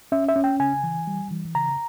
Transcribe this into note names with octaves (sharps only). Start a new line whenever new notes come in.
C#4 E5
E5
C#4
G5
C#3 G#5
E3
G3
E3
C#3 A#5